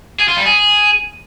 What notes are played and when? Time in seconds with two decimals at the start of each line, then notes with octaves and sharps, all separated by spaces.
0.19 G#4
0.28 F4
0.37 G3
0.46 G#4